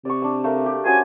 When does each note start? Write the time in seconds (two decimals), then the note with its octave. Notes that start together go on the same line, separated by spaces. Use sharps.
0.05 C3 D5 C#6
0.22 D4 E6
0.44 A3 A#4 F5
0.66 G4
0.85 C#4 F#4 C5 G#5